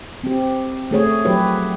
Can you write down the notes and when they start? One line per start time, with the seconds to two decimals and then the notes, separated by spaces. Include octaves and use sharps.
0.23 C4 G4
0.91 A3 G#4 C#5
1.25 F3 F#3 G4 B4 C#5